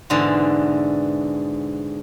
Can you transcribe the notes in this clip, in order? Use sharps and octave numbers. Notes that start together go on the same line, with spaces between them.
G#2 B2 D3 E3